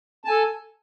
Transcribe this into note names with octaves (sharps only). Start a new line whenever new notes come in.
A4 G#5 A5